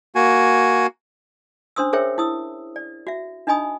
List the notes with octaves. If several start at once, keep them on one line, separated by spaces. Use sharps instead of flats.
A#3 F#4 G#5
C#4 D4 C5 C6 D#6 E6
G#4 A#4 C5 C#5 E5 G5
E4 D#6 E6
D5
F#4 E5
D4 D#4 D#5 G#5 B5 D#6